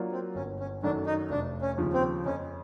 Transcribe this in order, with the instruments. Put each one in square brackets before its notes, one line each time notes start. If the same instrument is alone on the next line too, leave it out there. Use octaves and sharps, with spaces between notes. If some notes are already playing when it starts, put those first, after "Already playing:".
Already playing: [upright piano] F#3 A#3 D4 F4
[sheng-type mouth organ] C4
[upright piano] G1 [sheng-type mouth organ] C#4
[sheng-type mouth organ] C#4
[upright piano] F#2 D#3 F#3 A3 [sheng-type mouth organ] D4
[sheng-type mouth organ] D#4
[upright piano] F1 [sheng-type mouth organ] D4
[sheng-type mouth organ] C#4
[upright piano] D#2 C#3 F3
[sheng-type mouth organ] C4
[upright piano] F2 [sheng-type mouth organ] C#4